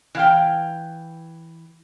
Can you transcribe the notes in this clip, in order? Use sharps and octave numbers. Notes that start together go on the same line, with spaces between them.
E3 F5 G5